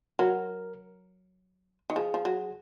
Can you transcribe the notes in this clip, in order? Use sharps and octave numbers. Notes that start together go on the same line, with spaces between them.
F#3 A#4
D#3
F3 G#4
F3
F#3